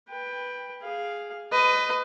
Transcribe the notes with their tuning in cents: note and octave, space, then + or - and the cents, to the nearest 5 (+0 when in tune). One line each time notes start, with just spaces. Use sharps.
B4 +0 G5 +15
G#4 +0 F5 +0
B4 +25 D#5 -5